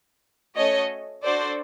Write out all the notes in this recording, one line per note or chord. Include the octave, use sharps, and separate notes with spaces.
A3 C#4 F#4 A4 C#5 D#5
D4 F#4 A4 C5 D5